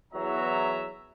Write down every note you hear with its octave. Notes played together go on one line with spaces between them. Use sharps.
E2 F#3 E5 A#5